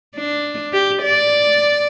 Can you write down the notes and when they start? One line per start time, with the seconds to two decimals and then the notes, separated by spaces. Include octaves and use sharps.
0.15 D4
0.73 G4
1.02 D5